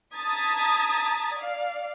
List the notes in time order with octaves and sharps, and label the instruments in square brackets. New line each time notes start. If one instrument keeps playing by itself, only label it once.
[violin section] A5 A#5 D#6 G#6 A6 B6
D5 F5